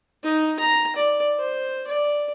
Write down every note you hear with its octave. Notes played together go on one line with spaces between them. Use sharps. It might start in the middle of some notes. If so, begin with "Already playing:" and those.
D#4
A#5
D5
C5
D5